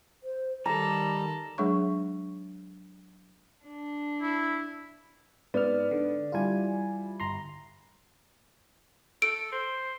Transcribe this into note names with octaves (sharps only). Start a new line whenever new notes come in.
C5
D#3 G3 A4 A#5
F#3 G#3 D4 G#4 C#5 C#6
D4
E4
G#2 B3 D5 F6
D3
E3 G3 F4 G#5
G1 A#5 C6
A4 D7
C5